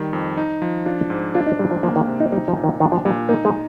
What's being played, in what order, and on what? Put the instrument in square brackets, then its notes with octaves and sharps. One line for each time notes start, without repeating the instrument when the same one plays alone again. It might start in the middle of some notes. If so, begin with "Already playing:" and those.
Already playing: [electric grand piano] D#3 G3
F2
D#4
F3
[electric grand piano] D4 [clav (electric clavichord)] F4
[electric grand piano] G#2
[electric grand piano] D4 [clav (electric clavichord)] F4
[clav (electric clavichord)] D#4
[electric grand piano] G#2 [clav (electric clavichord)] G3
[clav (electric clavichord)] F3
[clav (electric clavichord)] F3 [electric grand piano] A#3
[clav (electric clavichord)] D#3
[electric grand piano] C3
[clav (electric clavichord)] D#4
[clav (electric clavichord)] G3 [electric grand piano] D#4
[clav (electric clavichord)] F3
[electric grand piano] A#2
[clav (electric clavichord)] D#3
[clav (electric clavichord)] D#3 [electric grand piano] D4
[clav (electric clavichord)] F3
[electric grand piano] A#2 [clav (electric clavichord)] G3
[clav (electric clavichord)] A#3 [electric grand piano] D#4
[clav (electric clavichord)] G#3